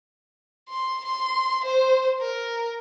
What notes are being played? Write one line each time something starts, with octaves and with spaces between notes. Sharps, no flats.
C6
C6
C5
A#4